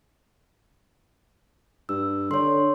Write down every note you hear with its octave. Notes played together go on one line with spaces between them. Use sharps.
G2 E6
D3 C#5 C6